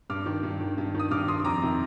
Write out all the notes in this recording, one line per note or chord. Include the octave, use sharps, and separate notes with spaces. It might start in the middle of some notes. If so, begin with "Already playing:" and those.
G2 D6 F6
D#3
G2
D#3
G2
D#3 D#6
G2 D6 F6
D#3 C6 D#6
F2 A#5 D6
C3 D#3